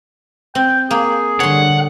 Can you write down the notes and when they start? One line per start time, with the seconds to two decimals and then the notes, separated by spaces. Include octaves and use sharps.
0.55 C4 G5
0.91 A#3 G#4
1.40 D3 G3 C#5 F#5 C6